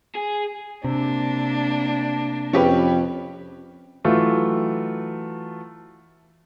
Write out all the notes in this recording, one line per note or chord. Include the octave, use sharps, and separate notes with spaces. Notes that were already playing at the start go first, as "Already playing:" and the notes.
G#4
C3 A#3 D4
F2 C#4 G4 B4
E3 F#3 A3 F4